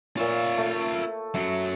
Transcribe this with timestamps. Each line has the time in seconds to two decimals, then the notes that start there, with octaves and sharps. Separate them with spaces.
0.17 A#2 F4 C#5 E5
0.58 A3
1.34 F#2 F#3 E5